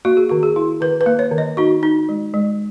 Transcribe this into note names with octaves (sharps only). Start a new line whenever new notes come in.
A#3 F#4
G#4
D#3 F#4
G#4
E4
D#3 B4
B4
A#3
C#5
D#3
D#5
D#4 F#4
D#4
G#3
G#3